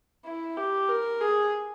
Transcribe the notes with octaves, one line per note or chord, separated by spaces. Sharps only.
E4
G4
A#4
G#4